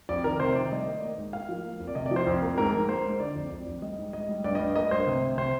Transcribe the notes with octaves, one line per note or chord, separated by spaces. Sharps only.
F2 D5
D#3 A#4
C3 C5
D#3 D5
G3 D#5
A#3
A#3
G#2
A#3 F5
F3
A#3
F2
D5
C3 D#5
D5
F3
C5
F2
A#3
G#2 A#4
G#2
A#3 C5
G#2
D3 D5
F2
F2
F2
G3 D#5
G#2
G#2 D#5
G3
G2 D5
D#5
G2
A#3 D#5
G2 C5
C3
C3
C3 C5